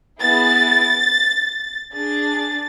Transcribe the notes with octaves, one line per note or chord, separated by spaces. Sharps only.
B3 E4 G#4 A6
D4 G#4 A6